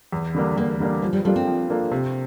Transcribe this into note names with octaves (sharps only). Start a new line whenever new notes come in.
E2
D3 G3 A#3 D4
E2 A#3
D3 G3 A#3 D4
F3 G3
G3
G3 A#3 D4 F4 A4
C4
F3
A#3 D4 F4 A4
C3